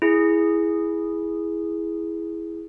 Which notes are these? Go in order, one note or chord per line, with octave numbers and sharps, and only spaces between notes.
E4 G#4